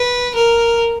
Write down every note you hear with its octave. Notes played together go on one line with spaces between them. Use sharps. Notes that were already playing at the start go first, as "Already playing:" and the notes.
Already playing: B4
A#4